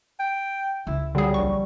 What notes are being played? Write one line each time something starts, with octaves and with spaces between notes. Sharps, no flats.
G5
C#2 E4
D3 F#3 G3 G#4
A#1 C#6